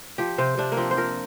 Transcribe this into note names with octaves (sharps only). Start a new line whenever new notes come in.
F3 G4
C3 C5
C3 D4
A#3
F3 C4
C5
F3 A#4